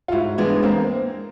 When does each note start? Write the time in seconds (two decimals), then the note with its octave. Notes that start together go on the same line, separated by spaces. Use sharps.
0.08 F4
0.12 G#2 E4 F#4
0.38 E3 G#3 B3 D4
0.63 A#3 C4